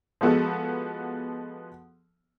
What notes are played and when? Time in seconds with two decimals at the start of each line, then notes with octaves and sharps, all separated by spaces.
0.21 F3 G#3 B3 F#4 A4